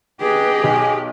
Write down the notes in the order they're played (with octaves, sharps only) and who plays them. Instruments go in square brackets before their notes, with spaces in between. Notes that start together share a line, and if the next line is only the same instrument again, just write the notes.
[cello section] G4 [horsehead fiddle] G#4 D#5 [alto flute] B4
[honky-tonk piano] B1 [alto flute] G#5